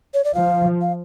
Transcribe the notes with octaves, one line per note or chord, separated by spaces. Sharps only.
C#5
D5
F3 F5
F5